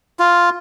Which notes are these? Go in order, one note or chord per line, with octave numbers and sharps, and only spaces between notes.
F4